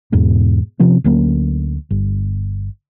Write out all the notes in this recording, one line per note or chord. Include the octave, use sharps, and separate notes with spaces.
E2 G#2 B2
C3 F3 C4 C#4
D2 F#3 A#3 C#4
G1